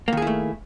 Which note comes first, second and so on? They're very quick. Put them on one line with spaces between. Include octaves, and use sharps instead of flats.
A#3 D#3 G#4 E4 A3